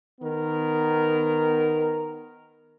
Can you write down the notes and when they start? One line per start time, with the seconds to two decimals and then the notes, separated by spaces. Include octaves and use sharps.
0.20 D#3 B3 A#4